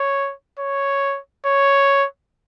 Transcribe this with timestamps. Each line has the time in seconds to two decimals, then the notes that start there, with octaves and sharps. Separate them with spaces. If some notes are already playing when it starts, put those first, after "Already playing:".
Already playing: C#5
0.59 C#5
1.46 C#5